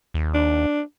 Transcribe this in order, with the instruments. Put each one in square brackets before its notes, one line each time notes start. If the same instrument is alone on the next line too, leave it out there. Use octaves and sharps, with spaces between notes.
[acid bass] D#2
[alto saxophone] D4